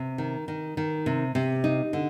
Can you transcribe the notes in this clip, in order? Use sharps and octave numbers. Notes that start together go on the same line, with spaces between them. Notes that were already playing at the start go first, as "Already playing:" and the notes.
Already playing: C3
D#3
D#3
D#3
C3
C3
D#4
D3